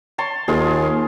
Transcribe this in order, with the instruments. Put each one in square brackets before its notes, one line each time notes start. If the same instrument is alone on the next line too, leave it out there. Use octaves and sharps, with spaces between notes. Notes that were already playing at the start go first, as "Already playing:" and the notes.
[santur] C#5 A5 C6
[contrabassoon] D#2 [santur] F4 G#4